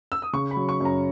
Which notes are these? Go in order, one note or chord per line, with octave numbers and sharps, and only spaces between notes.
E6
D#6
C#3 C#6
B5
F#3
C#6
F#2 A#5